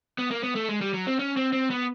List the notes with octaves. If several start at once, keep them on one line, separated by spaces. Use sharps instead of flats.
B3
A#3
B3
A3
G#3
G3
F#3
C4
C#4
C4
C4
B3